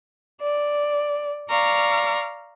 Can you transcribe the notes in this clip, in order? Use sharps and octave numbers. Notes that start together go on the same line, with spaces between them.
D5
D5 F5 A#5 C#6